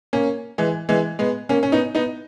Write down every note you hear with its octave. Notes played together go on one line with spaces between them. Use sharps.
A#3 C#4
E3 G#3
E3 G#3
G#3 B3
A#3 C#4
C#4
B3 D#4
B3 D#4